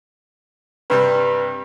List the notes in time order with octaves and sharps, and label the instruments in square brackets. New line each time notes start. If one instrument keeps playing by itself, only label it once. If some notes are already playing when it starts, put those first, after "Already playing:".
[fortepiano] G2 C3 G3 [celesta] B4